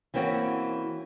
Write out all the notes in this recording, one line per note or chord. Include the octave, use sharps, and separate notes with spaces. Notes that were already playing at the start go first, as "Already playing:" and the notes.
E3 A#3 C4 C#4 F#4